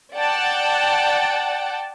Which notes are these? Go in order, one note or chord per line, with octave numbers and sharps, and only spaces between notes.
D5 F#5 G5 A5